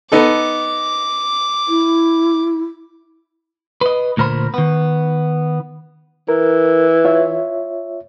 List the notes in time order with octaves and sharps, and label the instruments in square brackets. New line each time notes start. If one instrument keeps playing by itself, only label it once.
[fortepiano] B3 D#4 A4 [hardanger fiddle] D6
[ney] E4
[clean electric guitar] B4 D#5
D2 A#2 A#4 C5 B5
D#3 B3
[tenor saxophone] E3 [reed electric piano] A#4
[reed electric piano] F4 C#5 E5